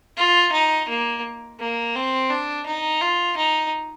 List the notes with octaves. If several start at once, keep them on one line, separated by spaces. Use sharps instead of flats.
F4
D#4
A#3
A#3
C4
D4
D#4
F4
D#4